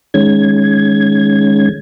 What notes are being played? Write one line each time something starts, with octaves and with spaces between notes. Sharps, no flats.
D#3 G#3 C#4 G#6